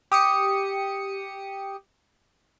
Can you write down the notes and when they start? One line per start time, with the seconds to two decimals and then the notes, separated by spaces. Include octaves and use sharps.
0.12 G4 D#6 C#7